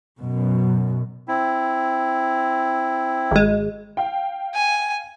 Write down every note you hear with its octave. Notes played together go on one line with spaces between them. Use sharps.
F#2 B2
C4 E4
G#1 G#3
F5 G5
G#5